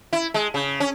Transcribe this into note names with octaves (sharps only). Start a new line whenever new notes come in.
E4
G#3
C#3
C#4